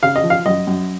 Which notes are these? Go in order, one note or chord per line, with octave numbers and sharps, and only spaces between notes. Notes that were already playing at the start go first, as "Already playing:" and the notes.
C#3 F5
D#5
F3
F5
F#2 D#5
F#2